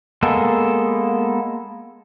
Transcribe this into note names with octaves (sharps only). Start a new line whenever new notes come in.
G#3 A#3 B3 A4